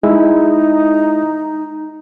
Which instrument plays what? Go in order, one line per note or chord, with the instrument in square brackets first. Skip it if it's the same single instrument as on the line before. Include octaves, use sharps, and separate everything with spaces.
[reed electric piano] G#3 E4 [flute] D#4